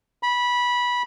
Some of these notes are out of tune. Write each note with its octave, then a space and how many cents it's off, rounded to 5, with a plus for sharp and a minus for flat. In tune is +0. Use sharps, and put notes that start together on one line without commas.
B5 -15